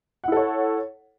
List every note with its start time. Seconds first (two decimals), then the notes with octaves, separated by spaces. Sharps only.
0.24 F#5
0.28 E4
0.32 A4
0.36 C#5